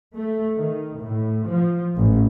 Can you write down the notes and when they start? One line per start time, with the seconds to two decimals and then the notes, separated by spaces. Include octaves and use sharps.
0.15 A3
0.57 D#3
0.99 A2
1.48 F3
1.96 A1